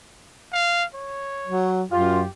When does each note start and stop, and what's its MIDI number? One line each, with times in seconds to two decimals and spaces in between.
0.53 0.85 77
0.95 1.73 73
1.47 1.83 54
1.91 2.26 42
1.91 2.20 65
1.91 2.29 67